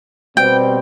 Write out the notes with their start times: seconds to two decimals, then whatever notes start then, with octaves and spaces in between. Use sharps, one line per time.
0.37 B2 G3 C4 G5